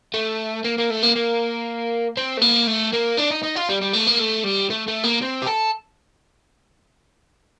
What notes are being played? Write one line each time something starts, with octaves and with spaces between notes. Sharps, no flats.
A3
A#3
A#3
A3
A#3
A#3
C4
A3
A#3
A3
A#3
D4
D#4
D#4
F4
G3
G3
A3
A#3
A3
G3
A3
A3
A#3
C4
G4
A4